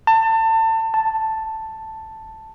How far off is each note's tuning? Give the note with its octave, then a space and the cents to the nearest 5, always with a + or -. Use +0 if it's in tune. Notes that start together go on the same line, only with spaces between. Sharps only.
A5 +30
A5 +5